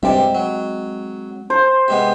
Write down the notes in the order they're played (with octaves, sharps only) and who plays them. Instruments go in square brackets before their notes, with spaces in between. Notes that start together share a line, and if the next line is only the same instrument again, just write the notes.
[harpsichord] G2 C3 D5 [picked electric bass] G#3 A#3 C4
[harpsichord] F#3
[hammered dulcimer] C5
[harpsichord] C3 G#3 B3